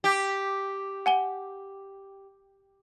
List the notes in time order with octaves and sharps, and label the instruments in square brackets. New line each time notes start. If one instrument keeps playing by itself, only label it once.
[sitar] G4
[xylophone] F#5 G#5 G7